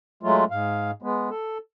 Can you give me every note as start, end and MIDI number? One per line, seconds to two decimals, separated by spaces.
0.23 0.44 54
0.23 0.44 56
0.23 0.44 57
0.23 0.44 65
0.51 0.91 44
0.51 0.91 77
1.02 1.29 56
1.02 1.29 59
1.30 1.58 69